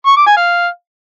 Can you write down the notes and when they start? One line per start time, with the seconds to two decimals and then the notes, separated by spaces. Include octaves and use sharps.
0.07 C#6
0.17 D6
0.27 G#5
0.37 F5